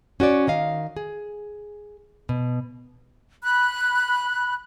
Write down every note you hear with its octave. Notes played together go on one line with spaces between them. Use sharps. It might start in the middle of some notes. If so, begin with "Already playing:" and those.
C#4 F#4 C#5 D5
D#3 D#5 F5
G#4
B2
B5 F#6